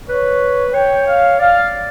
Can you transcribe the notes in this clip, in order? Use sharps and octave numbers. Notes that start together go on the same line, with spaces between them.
B4 C#5
C#5 G5
F5
D5 F5